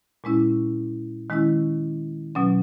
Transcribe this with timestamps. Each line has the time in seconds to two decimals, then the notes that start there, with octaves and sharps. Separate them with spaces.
0.24 A#2 G#3 C#4 E4
1.30 D#3 G#3 C#4 E4
2.35 B2 F#3 C#4